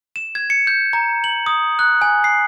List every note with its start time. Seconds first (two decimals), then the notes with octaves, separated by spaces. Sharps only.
0.16 E7
0.35 G#6
0.50 C#7
0.67 G6
0.93 A#5
1.24 F#7
1.46 D#6
1.79 F#6
2.02 G#5
2.24 C7